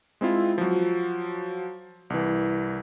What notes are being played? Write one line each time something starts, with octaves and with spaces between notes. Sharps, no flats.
G#3 C4 E4 F4
F3 F#3
C2 E3